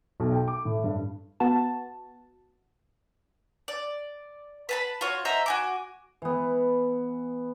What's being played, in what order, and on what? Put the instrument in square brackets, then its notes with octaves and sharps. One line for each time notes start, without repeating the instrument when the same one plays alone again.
[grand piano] B1
G5
D6
A2
G2
[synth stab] B3 F#4 A5
[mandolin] D5
B4 A5 B5
F4 F#4 C#5
C5 D#5 E5 A#5
F#4 G#5 D6
[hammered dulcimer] E3 B3